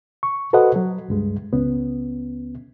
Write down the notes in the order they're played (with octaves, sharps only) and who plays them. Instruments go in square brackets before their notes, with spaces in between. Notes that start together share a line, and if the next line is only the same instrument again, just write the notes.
[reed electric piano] C#6
F#4 A4 B4 C5 D#5 F#5
F#3
C#2 G2 G#3
C#2 B3 C#4